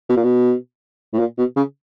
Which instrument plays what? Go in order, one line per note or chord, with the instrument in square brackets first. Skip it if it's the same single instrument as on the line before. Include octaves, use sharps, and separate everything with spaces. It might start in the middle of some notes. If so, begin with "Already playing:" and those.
[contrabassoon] B2
A#2
B2
A2
A#2
B2
C#3